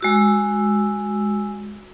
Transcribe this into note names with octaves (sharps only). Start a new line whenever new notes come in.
G#3 F#4 E6